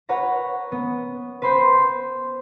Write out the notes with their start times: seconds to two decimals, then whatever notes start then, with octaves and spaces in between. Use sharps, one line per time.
0.09 B4 C#5 F#5 A#5
0.72 B3
1.42 B4 C5 B5 C6 G6